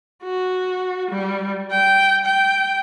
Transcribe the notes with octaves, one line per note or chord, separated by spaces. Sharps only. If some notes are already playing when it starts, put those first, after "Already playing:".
F#4
G3
G5
G5